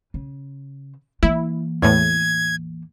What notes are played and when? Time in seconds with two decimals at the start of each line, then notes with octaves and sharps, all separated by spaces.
0.14 C#3
1.23 E3 A#3 E4
1.82 E2 A2 G#6